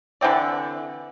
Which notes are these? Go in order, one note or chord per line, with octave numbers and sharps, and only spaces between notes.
D3 E3 C4 D5